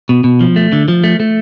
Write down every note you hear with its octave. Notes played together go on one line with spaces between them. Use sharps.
B2
B2
F3
A3
D3
F3
A3
A3